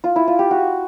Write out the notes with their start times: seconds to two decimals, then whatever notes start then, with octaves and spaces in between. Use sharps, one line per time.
0.04 F4
0.16 E4
0.27 F4
0.39 G4
0.51 F#4